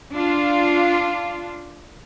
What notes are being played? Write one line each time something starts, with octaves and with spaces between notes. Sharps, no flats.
D4 F4